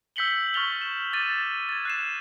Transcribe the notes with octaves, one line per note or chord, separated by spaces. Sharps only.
E6 G6 B6 C#7 F#7 G7
C#6 F6 A6 F7 G7
E7
D6 A6 D#7
G#6 A6
F#6 C7 E7